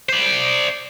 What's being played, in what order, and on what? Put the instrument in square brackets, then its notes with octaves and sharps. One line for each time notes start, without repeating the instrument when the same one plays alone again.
[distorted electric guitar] C5 D5